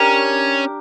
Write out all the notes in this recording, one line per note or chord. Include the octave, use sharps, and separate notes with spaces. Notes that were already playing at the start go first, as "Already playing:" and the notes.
Already playing: C#4 D4 G4 A#4